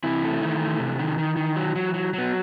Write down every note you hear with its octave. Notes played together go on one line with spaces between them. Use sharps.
C3 E3 E4
A3
D#3
A3
C3
D#3
D#3
D#3
F#3
F#3
F#3
F#3 B3